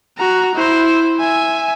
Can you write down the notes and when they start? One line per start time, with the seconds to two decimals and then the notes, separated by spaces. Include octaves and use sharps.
0.18 F#4 A#5
0.55 E4 C5
1.19 E5 G#5